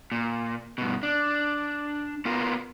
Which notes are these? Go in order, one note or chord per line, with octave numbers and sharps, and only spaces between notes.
A#2
G2 B2
D4
B3 F4 A#4